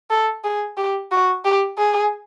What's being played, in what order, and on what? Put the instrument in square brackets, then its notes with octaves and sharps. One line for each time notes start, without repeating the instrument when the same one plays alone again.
[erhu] A4
G#4
G4
F#4
G4
G#4